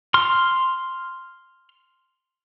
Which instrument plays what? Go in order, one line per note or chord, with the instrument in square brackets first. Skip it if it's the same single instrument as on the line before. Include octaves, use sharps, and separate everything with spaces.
[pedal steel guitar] C6 F6